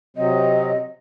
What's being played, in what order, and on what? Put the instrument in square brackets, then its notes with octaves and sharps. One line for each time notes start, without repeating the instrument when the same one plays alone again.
[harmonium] C3 F#3 C4 [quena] D#5